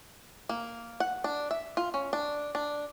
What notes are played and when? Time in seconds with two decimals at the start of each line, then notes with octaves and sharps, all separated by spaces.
0.49 A#3
1.00 F#5
1.24 D4
1.51 E5
1.77 F4
1.94 C#4
2.13 D4
2.55 D4